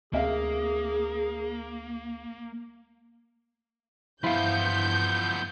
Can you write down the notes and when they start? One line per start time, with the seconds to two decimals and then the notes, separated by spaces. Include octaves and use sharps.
0.13 D2 C3 A#3 G#4 E5 F5
4.24 G2 E3 F3 B3 E4 F5 G6